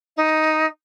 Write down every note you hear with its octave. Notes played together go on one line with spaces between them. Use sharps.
D#4